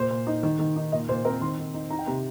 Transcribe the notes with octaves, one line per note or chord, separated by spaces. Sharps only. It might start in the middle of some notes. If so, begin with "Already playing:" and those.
Already playing: A#2 C5
A#2
D#4
D#3
D#3
D#4
A#2 D#5
A#2 C5
C4 A#4
D#3 C6
D#3
D#4
D#4 A#5
G5
C3 A#5